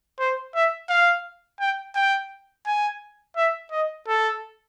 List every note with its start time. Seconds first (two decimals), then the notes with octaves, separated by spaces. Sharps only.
0.19 C5
0.55 E5
0.90 F5
1.60 G5
1.95 G5
2.66 G#5
3.37 E5
3.72 D#5
4.08 A4